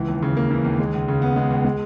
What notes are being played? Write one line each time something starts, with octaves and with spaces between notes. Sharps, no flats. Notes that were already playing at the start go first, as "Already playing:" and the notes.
Already playing: C#2 E3
D#2
C#3
A#3
E3
D#2
G#3
C#2
C#3
B3
G#3
C#2
G#3